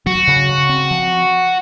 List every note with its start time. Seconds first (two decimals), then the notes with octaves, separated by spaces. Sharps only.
0.06 F#3 F#4
0.27 C#3
0.49 C#3
0.69 C4
0.91 F3